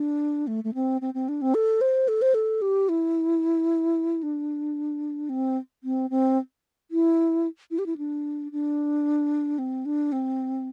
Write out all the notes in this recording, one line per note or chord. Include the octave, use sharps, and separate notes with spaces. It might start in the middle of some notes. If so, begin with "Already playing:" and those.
Already playing: D4
A3
A3
C4
C4
C4
D4
C4
A4
C5
A4
C5
A4
G4
E4
D4
C4
C4
C4
E4
E4
G4
E4
D4
D4
C4
D4
C4